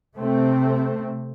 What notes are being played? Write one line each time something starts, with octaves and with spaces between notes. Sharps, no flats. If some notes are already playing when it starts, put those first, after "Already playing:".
C3 A3 C4